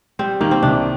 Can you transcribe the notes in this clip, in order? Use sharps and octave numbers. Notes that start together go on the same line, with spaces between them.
G3 C4
D#3 A#3
C4
C2 D4